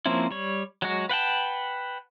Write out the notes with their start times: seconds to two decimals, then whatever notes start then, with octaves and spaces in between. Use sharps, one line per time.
0.06 F3 A#3 C4 C#4 E4
0.31 G3 C#5
0.82 F#3 G#3 F#4
1.09 B4 F#5 G5 A5